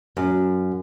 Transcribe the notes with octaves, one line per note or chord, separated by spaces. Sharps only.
F#2